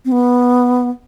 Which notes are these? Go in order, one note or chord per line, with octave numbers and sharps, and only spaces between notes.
C4
B3